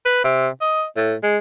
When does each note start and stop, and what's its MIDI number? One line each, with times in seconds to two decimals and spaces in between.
0.06 0.23 71
0.24 0.48 48
0.61 0.84 75
0.97 1.14 45
1.23 1.38 56